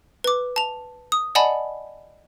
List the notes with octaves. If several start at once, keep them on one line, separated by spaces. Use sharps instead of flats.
B4 D6
A5 F7
D#6
D5 D#5 F#5 G#5 A5 B5